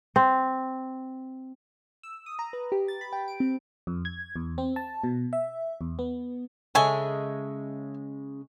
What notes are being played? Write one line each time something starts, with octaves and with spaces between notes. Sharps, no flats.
C4
E6
D#6
A#5
B4
G4
A6
B5
G5
D7
C4
F2
G#6
E2
C4
A5
B2
E5
E2
B3
C#3 G#3 A4 C#5 E5 G#5